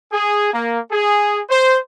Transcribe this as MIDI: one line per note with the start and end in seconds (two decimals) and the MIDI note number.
0.12 0.50 68
0.53 0.79 58
0.91 1.38 68
1.49 1.77 72